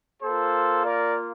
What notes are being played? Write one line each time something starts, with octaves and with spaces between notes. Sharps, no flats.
A#3 F4 A4 C5
A#4 D5